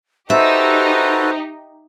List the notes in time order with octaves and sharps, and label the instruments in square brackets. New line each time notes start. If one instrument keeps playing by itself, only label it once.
[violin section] D#4 G4 [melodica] F#4 A4 B4 [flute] C5 [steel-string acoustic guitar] E5